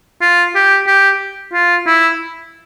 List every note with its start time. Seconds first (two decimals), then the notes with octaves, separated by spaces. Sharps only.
0.21 F4
0.55 G4
0.87 G4
1.53 F4
1.86 E4